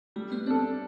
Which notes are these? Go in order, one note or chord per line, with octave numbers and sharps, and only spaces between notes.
G3 A3
B3
C4 D4 A4